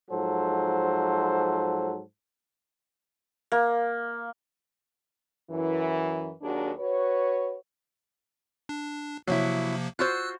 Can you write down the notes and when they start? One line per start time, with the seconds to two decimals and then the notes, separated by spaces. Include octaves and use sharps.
0.11 G#2 F3 F#3 A4 C5
3.52 A#3
5.50 F#2 E3
6.42 D#2 F#3 D4 F#4 G#4
6.79 F#4 B4 C#5
8.69 D4
9.27 C3 F3 F#3 A#3 E4
9.99 F4 F#4 C5 E6 F#6